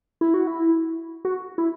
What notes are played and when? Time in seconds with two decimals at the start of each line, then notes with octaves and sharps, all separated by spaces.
0.21 E4
0.34 F#4
0.47 E4
1.25 F#4
1.58 E4